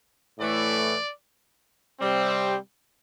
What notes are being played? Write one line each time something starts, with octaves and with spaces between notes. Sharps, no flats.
A2 E3 A3 D5
C3 G3 C4